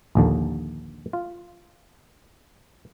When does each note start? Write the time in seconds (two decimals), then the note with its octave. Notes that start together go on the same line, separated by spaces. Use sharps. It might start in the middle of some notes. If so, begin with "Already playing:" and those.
0.15 A#1 D#2 D3
1.13 F4